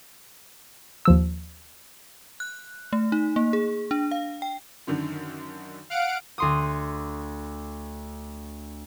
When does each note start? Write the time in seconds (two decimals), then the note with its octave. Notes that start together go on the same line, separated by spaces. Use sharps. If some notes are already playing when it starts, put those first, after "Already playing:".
1.05 D#2 F3 E6
2.40 F#6
2.93 A3
3.12 D#4
3.36 A#3
3.53 G#4
3.91 D4
4.11 F5
4.42 G5
4.87 F#2 D3 D#3
5.90 F5 F#5 D7
6.38 D2 C6 D#6